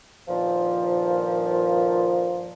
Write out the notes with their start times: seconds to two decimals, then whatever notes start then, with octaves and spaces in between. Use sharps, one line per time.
0.28 G2 A#2 D#3 F3